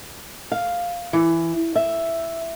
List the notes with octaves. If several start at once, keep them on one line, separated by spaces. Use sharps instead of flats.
F5
E3
E5